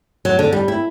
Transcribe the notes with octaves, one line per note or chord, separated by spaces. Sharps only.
F#3
D3
G3
E4